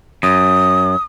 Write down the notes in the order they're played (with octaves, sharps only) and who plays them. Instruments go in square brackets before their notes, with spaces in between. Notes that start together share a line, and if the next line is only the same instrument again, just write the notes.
[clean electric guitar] F#2 [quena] D#6